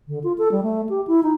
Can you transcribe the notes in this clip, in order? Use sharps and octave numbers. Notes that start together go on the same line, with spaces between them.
D3
F4
A4
G3
A3
G4
E4
D#4